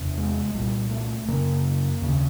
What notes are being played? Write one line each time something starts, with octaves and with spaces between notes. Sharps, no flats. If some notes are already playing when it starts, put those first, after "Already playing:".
Already playing: E2 C3
G#3
C2 A#2 G3
A3
F#2 C#3 A#3
D#2 C#3